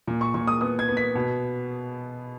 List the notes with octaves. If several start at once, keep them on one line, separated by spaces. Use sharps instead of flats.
A#2
C#6
A#2 C#6
D#6
B3 D#6
G#6
B3
B6
B2